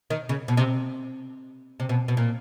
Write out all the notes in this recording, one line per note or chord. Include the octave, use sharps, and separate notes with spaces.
D#3
C#3
B2
C3
C3
B2
B2
A#2